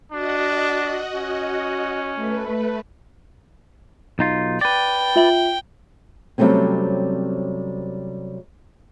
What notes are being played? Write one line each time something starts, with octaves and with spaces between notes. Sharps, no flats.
D4 F#4 D#5 F#5
C#4
A3 B4
B1 D#4 F4
B4 D5 G5
F4 E5 F#7
C3 F#3 G3 A3 C4 C#4